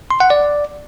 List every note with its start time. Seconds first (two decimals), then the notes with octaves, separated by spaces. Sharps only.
0.11 C6
0.20 F#5
0.30 D5